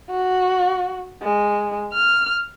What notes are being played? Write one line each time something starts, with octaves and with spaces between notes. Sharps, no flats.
F#4
G#3
F6